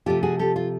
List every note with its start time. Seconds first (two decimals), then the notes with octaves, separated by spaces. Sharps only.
0.06 C3 F3 A3 F4 G4
0.23 F#4 G#4
0.39 G4 A4
0.56 F4